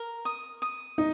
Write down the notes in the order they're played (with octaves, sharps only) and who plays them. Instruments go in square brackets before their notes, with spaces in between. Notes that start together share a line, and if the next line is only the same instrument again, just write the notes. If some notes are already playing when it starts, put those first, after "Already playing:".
Already playing: [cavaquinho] A#4
D#6
D#6
[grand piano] D#4